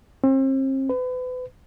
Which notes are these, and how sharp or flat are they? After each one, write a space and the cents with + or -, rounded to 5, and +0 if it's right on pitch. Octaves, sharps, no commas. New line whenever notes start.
C4 +40
B4 +35